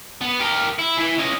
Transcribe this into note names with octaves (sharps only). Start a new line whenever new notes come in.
B3
G4 A#4
E4
E3 E4
C#4 D#5